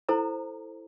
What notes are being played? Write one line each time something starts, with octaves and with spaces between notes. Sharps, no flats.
E4 A4 C5 A#5